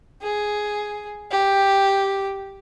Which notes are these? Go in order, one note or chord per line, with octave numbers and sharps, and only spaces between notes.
G#4
G4